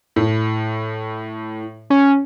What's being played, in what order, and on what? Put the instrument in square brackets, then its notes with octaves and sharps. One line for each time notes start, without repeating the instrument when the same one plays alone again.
[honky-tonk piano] A2
[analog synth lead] C#4